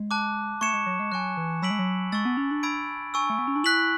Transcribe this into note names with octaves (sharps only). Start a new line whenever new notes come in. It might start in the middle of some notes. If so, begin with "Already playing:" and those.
Already playing: G#3
A5 D6 F#6
A3 C#6 G#6 C#7 E7
G#3
F#3
G#3
F#3 G#5 C#6 F#6
E3
F#3 B5 E6 B6 D7 F#7
G#3
F#3
G#3 C#6 E6 A6
B3
C#4
D4
B5 E6 G#6 D7
G#5 C#6 E6
A3
B3
C#4
D4
E4 F#6 B6 F#7